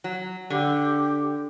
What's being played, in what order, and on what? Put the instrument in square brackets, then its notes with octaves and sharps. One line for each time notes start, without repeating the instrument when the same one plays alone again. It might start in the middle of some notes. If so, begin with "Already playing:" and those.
[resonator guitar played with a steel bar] F#3
[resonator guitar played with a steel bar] D3 [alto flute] G4